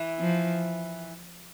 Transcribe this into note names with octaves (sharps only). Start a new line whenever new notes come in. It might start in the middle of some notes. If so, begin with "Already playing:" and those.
Already playing: E3 E4
F3